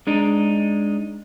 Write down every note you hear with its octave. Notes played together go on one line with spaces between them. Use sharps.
G#3 D4 D#4